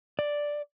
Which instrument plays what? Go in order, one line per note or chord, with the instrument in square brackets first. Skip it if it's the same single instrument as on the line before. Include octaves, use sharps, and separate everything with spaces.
[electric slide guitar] D5